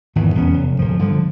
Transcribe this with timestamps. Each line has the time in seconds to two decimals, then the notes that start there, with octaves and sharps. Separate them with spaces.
0.16 G#1 E2 D#3 E3
0.35 D#1 E2 B3 C#4
0.54 F1
0.79 D1 F3
0.99 G2 D3 F3